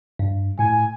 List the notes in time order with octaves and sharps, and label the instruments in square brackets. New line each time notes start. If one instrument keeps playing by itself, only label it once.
[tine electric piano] G2
[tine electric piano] A2 [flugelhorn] G#5